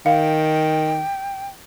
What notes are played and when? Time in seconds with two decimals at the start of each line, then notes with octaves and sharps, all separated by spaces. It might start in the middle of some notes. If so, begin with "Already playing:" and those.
0.06 D#3 F5 G5